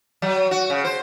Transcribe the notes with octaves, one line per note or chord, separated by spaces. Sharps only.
F#3
F#4
C#3
C5